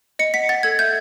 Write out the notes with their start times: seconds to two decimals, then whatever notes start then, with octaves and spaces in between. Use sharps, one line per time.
0.19 D#5 C#7
0.34 F#5 B6
0.49 F#5 A6
0.63 A4 G#6
0.79 E5 G6